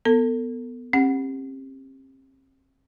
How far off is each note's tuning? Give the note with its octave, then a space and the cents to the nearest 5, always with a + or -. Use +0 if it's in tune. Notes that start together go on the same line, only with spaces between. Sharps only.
B3 +0 A4 +35
C4 +40 G4 +25 F#5 +0